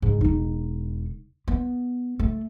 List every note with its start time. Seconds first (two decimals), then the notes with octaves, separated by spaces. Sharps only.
0.02 G#2
0.21 E1 D#4
1.48 B3
2.19 A3